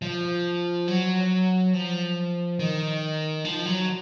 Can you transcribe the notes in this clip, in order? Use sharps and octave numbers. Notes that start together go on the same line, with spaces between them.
F3
F#3
F3
D#3
F3
F#3